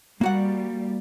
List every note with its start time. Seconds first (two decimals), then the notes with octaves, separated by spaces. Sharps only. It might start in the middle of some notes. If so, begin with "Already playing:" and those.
0.21 G3 A#3 F#4 F#5